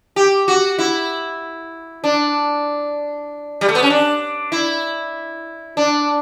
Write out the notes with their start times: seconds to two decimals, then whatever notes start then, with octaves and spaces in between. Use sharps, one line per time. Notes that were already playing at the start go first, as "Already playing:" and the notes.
0.16 G4
0.48 F#4
0.78 E4
2.04 D4
3.61 G3
3.68 A3
3.75 B3
3.83 C#4
3.90 D4
4.52 E4
5.77 D4